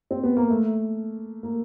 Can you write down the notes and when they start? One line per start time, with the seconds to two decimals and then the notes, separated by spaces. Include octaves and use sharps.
0.11 C4
0.24 B3
0.37 A#3
0.50 A3
1.43 A#3